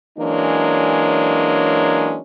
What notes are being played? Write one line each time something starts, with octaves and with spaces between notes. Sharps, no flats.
E3 F#3 G#3 A#3 C#4 D4